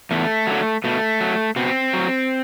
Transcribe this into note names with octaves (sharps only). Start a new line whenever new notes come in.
E2 A3
D3 F#3
B2 A3
F#3
B2 C4
F#3